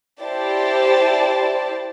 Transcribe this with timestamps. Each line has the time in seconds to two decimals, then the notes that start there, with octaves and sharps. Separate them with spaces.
0.21 E4 G4 C5 D5 A5